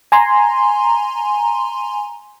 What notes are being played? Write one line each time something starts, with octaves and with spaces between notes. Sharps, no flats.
G#5 A#5 C6